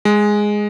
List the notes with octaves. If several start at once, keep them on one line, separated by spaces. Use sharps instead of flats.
G#3